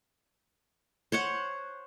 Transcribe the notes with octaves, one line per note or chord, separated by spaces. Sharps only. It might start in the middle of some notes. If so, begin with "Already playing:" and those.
C5 C#5 F#5